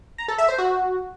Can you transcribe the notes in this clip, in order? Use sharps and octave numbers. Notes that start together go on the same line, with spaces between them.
A#5
A4
E5
C5
F#4